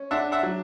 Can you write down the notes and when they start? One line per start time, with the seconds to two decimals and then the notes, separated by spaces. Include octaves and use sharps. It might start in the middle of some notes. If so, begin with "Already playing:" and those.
Already playing: C#4
0.11 D4 E5 F#5
0.32 E5 F#5
0.43 F#3